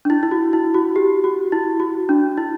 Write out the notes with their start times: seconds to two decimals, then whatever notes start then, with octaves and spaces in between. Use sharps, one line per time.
0.05 D4
0.10 E4
0.23 E4
0.31 F#4
0.53 E4
0.74 F#4
0.96 G4
1.24 F#4
1.52 E4
1.80 F#4
2.09 D4
2.37 E4